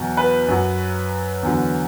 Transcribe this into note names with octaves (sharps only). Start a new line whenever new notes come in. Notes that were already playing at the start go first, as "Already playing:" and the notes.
Already playing: E2 B2 F#3
B4
F#2 F#3
E2 D3 F#3